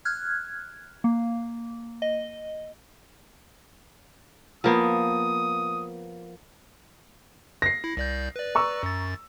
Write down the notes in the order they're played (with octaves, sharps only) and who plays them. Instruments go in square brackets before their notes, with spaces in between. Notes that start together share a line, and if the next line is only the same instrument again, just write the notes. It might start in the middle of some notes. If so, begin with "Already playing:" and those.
[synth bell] F6 F#6 G#6
A#3
D#5
[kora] F3 A#3 B3 [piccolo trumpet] D#6
[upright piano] A#6 C7
[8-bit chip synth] E4
C2 D5 G6
B4 D5
[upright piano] A#5 C#6 E6
[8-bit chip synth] F#2 A6